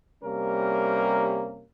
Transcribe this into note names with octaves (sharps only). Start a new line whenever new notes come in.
C3 G3 A#3 C#4 A#4